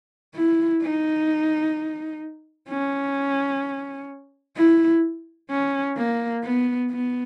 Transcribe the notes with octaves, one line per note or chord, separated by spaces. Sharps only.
E4
D#4
C#4
E4
C#4
A#3
B3
B3